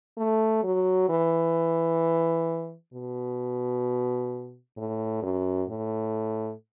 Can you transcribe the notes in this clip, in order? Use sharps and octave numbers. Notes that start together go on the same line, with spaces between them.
A3
F#3
E3
B2
A2
F#2
A2